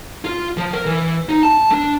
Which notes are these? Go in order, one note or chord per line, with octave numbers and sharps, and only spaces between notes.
F4
F3
A#4
E3
D#4
A5
D4